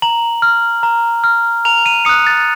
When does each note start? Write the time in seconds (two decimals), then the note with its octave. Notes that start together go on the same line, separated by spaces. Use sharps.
0.02 A#5 F#7
0.42 F6
0.83 A#5
1.24 F6
1.65 A#5 F7
1.86 D#7
2.05 D#6 F#6 C#7
2.27 A6